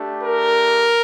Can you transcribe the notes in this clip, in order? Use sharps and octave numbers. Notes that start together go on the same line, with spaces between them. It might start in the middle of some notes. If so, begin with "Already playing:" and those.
Already playing: A3 D4 G4
A#4